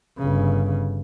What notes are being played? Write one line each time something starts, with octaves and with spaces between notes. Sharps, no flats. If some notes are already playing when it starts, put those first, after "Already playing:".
G1 C#3